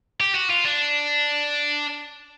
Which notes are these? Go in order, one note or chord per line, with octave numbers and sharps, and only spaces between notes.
G4
F#4
F4
D4